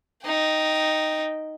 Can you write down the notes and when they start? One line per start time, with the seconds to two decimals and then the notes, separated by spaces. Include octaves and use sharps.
0.24 D#4 G5